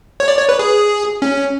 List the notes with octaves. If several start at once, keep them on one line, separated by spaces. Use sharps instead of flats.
C#5
D5
C#5
B4
G#4
C#4